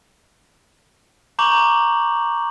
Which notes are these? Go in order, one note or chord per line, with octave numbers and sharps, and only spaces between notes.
A#5 C#6 D6 G6 F#7